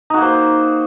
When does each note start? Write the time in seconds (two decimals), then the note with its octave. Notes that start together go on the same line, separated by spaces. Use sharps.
0.10 D#4
0.14 F#4
0.18 A#3
0.22 C5